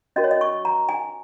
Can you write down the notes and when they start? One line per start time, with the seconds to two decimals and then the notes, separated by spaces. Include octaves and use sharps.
0.16 C#4 F#4 A#4 D#5
0.24 C#5
0.31 D#5
0.41 C#6
0.65 A#5
0.89 G#5